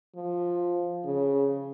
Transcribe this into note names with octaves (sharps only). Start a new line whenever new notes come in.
F3
C#3